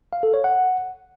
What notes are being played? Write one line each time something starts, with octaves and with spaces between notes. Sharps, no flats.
F5
A4
C#5
F#5